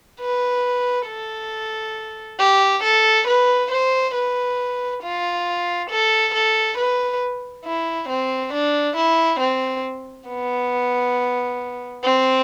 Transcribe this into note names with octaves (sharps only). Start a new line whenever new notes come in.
B4
A4
G4
A4
B4
C5
B4
F4
A4
A4
B4
E4
C4
D4
E4
C4
B3
C4